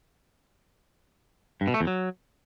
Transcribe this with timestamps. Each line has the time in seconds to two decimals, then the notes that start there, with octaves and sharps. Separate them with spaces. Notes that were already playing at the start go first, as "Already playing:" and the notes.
1.61 G2
1.68 B2
1.74 A3
1.81 E2
1.87 F#3